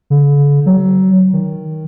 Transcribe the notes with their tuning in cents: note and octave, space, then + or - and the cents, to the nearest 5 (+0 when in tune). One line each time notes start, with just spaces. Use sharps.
D3 -45
F#3 +25
D#3 +10